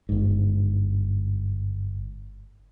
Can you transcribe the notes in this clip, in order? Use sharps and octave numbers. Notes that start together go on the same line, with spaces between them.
G1 G#2